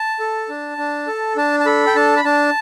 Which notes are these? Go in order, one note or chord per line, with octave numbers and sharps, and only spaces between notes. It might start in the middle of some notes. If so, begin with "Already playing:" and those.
Already playing: A5
A4
D4
D4
A4
D4 A5
A5
A4 B5
G5
D4 A5
B5
D4 A5